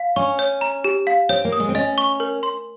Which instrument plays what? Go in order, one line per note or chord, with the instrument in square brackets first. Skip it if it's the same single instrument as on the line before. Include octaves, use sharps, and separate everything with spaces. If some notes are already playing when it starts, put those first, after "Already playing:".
Already playing: [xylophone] F5
[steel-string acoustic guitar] C#4 [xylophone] C#6
[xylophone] C#5
A#5
G4
F5
[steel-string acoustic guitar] C4 [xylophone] C#5
[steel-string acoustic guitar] A#3
[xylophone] D#6
[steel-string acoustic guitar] G#3
C4
[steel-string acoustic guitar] C#4 [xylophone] D#5
[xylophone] C#6
A#4
C6